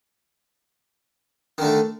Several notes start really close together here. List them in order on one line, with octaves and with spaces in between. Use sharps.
D#3 D3 A3